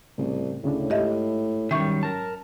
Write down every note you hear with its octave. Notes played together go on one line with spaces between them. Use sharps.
C2 A2 C#3
D2 A2 C#3 D4
G#2 G4 D#5 E5
F#2 D#3 G3 E5 C#6
A#4 A5